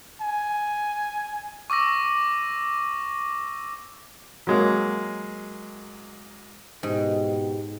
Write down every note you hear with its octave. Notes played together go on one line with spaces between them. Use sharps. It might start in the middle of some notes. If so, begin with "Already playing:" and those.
G#5
C#6 D6 E6 A#6
F#3 G#3 A#3
G#2 B2 G4